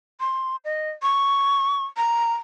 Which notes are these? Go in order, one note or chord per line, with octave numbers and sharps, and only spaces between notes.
C6
D#5
C#6
A#5